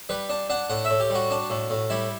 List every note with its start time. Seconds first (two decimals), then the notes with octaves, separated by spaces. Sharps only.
0.09 G3 B4
0.30 D4
0.50 D4 F#5
0.70 A2 F#5
0.85 E5
0.90 A2
1.00 G4
1.10 G3 F#4
1.31 D4
1.50 A2
1.70 A2
1.90 G3 E4